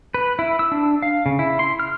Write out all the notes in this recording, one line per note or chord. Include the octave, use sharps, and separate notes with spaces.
B4
E4
E6
D4
F5
C#3
E4
C6
F6